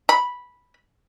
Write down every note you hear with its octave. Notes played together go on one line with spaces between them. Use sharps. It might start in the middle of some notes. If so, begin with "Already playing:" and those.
B5